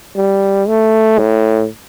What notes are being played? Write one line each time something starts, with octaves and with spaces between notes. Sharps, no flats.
G3
A3
A2